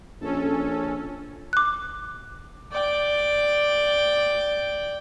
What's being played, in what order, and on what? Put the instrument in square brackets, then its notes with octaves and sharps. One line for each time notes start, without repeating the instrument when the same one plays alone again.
[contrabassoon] A#1 [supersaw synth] C#4 A4
[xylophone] D6 F#6
[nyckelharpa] D5 G5